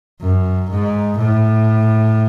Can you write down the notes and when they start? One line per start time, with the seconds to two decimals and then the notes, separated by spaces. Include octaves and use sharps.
0.22 F#2
0.70 G#2
1.18 A2